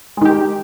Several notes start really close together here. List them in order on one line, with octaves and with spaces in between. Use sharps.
G#3 D#3 G4